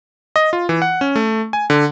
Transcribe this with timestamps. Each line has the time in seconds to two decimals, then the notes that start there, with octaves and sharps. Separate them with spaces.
0.36 D#5
0.53 F4
0.69 E3
0.82 F#5
1.01 C#4
1.16 A3
1.53 G#5
1.70 D3